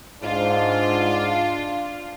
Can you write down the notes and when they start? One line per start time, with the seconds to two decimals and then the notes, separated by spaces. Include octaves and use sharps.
0.23 G#2 D4 F4